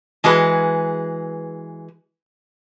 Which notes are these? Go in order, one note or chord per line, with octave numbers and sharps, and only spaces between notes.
E3 G#3 F#4 G#4 B4